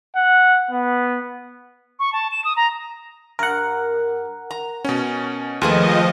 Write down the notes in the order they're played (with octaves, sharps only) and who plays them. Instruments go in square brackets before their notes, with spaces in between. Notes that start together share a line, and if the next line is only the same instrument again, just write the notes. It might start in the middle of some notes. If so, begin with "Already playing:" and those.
[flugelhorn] F#5
B3
[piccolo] C#6
A5
E7
D#6
A#5
[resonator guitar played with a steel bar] G2 [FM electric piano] A#4 F#5
[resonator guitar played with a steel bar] A#5
[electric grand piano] B2 C#4
[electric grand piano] D#2 A3 [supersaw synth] F3 D#5 [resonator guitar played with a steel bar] F4 G#4 B4